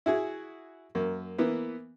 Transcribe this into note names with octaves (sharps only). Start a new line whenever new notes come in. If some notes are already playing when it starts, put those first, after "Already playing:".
E4 F#4 G#4
F#2 A#3
E3 A#3 B3